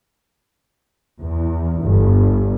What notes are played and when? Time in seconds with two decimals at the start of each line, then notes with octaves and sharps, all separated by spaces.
1.19 E2
1.80 G1